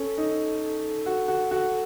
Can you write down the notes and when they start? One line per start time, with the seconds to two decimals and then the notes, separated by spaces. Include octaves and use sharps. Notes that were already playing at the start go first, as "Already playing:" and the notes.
Already playing: C#4 A4
0.18 D#4
1.06 F#4
1.28 F#4
1.51 F#4